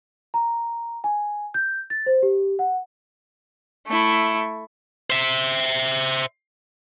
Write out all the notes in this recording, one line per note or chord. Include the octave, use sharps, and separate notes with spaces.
A#5
G#5
G6
A6
C5
G4
F#5
A3 E4
C5 E5